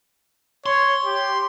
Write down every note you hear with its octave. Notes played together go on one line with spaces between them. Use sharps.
C#5 C6
G4